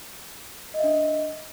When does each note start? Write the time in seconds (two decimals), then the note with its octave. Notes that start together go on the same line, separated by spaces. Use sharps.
0.74 D#5
0.79 E5
0.84 D4